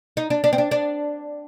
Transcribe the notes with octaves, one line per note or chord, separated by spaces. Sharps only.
D#4
D4
D4
C4
D4
D4